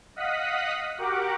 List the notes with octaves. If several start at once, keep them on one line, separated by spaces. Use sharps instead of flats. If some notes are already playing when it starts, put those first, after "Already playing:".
D#5 F5 F#5 D#6 F#6 B6
F#4 G4 A#4 F#5 D6